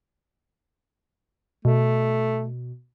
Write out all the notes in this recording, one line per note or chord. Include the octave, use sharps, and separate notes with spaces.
B2 A3